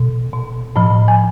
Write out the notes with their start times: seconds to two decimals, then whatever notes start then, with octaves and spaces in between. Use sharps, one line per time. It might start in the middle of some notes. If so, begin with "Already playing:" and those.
Already playing: B2
0.33 B2
0.76 A2 F3 B5
1.08 G#5